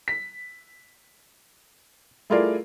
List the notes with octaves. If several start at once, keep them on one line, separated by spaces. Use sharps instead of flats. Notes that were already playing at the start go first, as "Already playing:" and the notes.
B6
A3 E4 F4 G#4 A#4 D5